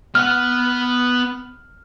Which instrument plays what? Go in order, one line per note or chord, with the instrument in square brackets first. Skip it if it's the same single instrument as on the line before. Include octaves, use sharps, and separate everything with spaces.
[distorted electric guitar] B3 F#5 [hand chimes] F6